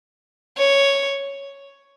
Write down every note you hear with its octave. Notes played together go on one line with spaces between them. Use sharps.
C#5